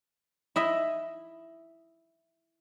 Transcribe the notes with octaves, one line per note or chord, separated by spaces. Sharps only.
E4 D#5 B5